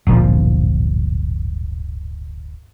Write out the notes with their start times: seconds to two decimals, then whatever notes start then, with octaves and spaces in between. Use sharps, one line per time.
0.07 D1 G1 A#2 F3